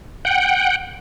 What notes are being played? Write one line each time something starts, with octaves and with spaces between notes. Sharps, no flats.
F#5 G5